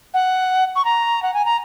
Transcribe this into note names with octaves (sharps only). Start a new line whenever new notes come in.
F#5
C#6
A#5
F#5
G#5
A#5